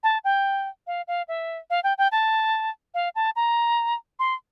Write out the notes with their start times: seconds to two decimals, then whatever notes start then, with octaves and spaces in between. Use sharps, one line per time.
0.04 A5
0.24 G5
0.87 F5
1.08 F5
1.28 E5
1.70 F5
1.84 G5
1.98 G5
2.12 A5
2.94 F5
3.16 A5
3.36 A#5
4.19 C6